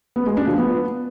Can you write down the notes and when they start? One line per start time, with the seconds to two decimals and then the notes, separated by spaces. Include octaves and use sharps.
0.16 B3
0.26 G#3
0.37 D4
0.47 F3
0.58 B3